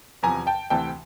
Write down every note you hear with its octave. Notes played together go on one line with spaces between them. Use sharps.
E2 C3 F3 G#5 A#5
G5 A5
D2 C3 E3 G5 A5